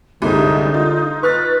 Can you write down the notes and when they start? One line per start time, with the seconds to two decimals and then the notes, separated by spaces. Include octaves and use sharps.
0.22 C2 G2 D3 G#3 D#4
0.74 F4
1.23 B4 C#6 F6 A6